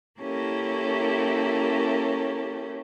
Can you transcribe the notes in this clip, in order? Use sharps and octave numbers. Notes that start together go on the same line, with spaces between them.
A#3 C#4 E4 G4 A4 A#4